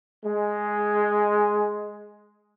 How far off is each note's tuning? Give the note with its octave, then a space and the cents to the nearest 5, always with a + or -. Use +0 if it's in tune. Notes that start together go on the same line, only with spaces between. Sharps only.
G#3 +5